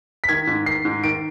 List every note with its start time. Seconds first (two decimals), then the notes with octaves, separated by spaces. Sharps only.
0.24 B6
0.29 D#3 G#6
0.47 G#2
0.66 D#3 C7
0.85 G#2
1.04 D#3 D7